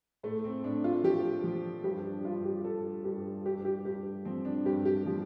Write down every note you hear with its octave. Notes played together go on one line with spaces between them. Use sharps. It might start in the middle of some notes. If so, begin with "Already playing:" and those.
A2 A3
C4
A2 D4
F4
F3 G4
F3
G2 G4
D4
G2 F4
G4
G2 A4
G2 G4
G2 G4
G4
G2 G4
F3 C4
D4
G2 G4
G4
F3